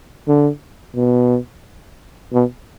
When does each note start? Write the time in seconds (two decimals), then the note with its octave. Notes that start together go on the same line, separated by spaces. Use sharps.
0.28 D3
0.96 B2
2.33 B2